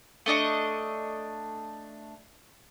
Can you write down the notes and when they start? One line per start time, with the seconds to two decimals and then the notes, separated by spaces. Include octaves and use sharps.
0.26 A3 D4 D#5 C#6